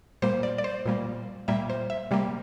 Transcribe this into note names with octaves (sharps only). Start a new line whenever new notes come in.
A#2 G3 A#3 C5
D5
D5
C5
A#2 G3 A#3
A#2 G3 A#3 E5
C5
E5
C3 G3 A#3